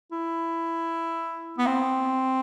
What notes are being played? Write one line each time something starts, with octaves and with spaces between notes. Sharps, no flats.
E4
B3
C4